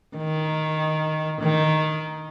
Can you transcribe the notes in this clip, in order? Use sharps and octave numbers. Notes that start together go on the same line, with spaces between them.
D#3
D#3